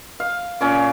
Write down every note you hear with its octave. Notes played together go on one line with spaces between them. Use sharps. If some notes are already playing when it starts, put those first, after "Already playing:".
F5
A#2 C#4 D6